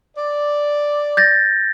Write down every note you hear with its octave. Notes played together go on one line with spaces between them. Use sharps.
D5
G6 A6 A#6